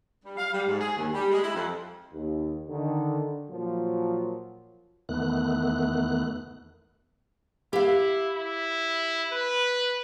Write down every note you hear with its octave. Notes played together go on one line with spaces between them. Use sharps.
G3
F5
G3
G#2
G#4
D#2
G3
G#3
E4
F2
D#2
D3 D#3
A#2 F3 F#3 F4
E2 D#3 A3 B3 F#6
E4 G4 F5
E4
B4